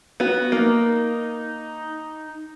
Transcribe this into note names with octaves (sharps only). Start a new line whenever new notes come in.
B3 F#4
A#3 D#4